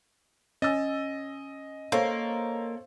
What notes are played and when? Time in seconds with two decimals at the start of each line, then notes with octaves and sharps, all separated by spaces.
0.62 C#4 D#5 G#5 E6 A6
1.92 A#3 A4 C5 C#5